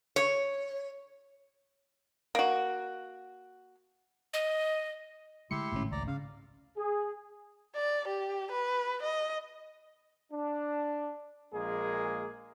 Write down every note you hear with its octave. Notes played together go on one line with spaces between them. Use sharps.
C#5
A#3 F#4
D#5
D3 G#3 A3 E4 G4 C6 C#7
G#1 A2 C#3 A3 C#4
C#2 D5 A#5
C#3 F5
G#4
D5
G4
B4
D#5
D4
A#1 G#3 A#3 G#4